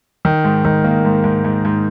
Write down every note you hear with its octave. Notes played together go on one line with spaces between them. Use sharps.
D#3
G#2
D#3
A#3
G#2
G#2
G#2
G#2